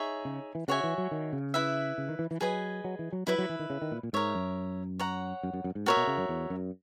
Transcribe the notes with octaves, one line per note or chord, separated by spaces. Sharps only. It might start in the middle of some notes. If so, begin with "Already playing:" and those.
Already playing: D#4 G#4 C#5 E5
C#3
E3
C#3 F#4 C#5 E5 G#5
E3
F#3
D#3
C#3
E4 B4 E5
C#3
D#3
E3
E3
F#3 G#4 B4 D#5 G#5
F#3
E3
F#3
F#3 E4 B4 E5
F#3
E3
D#3
C#3
D#3
A#2
A#2
G#2 A#4 C#5 E5
F#2
C#5 F#5 A#5
F#2
F#2
F#2
G#2
A#2 F#4 A#4 C#5 E5
B2
C#3
F#2
E2
F#2